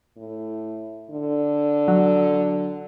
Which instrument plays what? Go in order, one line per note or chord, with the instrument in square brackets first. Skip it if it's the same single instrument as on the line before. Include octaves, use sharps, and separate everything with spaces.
[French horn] A2
D3
[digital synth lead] F#3